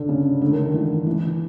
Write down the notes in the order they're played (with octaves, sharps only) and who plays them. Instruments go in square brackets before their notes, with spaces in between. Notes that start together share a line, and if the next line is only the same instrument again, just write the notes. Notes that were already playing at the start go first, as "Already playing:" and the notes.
Already playing: [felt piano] D3
C#3
D3
D#3
D#3
E3
E3